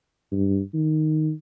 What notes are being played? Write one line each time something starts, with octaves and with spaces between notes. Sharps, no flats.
G2
D#3